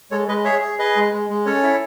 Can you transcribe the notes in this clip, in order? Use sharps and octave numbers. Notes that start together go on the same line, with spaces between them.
G#3 A4 C#5
G#3 B4 D#5
G#4 C#5 E5
G#4
G#4 B4 D#5
G#3
G#3
G#3
C#4 A4 C#5
E4